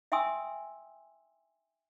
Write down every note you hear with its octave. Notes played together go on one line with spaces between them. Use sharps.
E5 G5 G#5 C6 D#6 E6